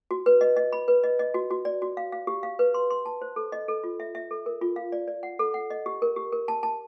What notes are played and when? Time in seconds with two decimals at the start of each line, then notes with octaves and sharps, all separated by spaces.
0.11 F#4
0.26 B4
0.41 D#5
0.56 D#5
0.73 B5
0.88 B4
1.04 D#5
1.19 D#5
1.34 F#4
1.50 F#4
1.65 D5
1.82 F#4
1.97 F5
2.12 F5
2.27 G4
2.43 F5
2.59 B4
2.74 C6
2.90 C6
3.06 A5
3.22 C5
3.36 A4
3.52 D#5
3.68 A4
3.84 F4
4.00 E5
4.15 E5
4.31 A4
4.46 A#4
4.61 F4
4.76 F5
4.92 D5
5.08 D5
5.23 F#5
5.39 A4
5.54 F#5
5.70 D#5
5.86 G4
6.02 A#4
6.16 G4
6.32 A#4
6.48 A5
6.63 A5